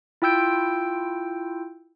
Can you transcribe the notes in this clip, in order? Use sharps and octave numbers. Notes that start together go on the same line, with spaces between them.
E4 F4 G5 E6 G6 D7